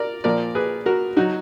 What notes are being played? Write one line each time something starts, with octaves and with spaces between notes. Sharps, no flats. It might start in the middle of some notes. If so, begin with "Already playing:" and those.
Already playing: A#4 D5
A#2 F3 A#4 D5
G#4 B4
F#4 A#4
F#3 D#4 F#4